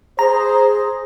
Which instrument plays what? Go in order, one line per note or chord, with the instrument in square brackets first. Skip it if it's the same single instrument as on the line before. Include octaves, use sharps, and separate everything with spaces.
[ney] G#4 [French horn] C5 [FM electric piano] A#5